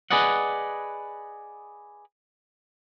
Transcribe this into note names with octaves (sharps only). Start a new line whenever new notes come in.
G#4 B4 D5 D#5 F#5